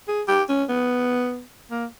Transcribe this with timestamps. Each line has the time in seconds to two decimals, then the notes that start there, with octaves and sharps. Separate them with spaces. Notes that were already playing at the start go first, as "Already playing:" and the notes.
0.08 G#4
0.28 G4
0.49 C#4
0.69 B3
1.71 A#3